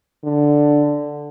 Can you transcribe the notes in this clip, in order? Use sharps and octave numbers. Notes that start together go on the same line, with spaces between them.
D3